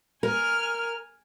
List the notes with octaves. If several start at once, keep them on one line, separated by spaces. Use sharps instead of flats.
A#4 G#5 F6